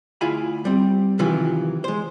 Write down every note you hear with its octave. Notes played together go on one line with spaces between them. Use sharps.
D2 E4 F4 G#4 G#5 B5
G3 C4
C3 D#3 E3 F#3 F4
G#3 C5